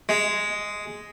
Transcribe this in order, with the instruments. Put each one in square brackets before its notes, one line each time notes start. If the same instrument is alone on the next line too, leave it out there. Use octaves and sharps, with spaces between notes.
[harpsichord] G#3